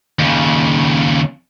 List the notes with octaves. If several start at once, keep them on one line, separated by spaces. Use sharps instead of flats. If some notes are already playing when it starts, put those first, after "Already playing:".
D#2 C#3